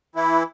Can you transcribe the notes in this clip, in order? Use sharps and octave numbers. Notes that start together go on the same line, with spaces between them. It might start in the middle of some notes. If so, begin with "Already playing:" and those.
E3 E4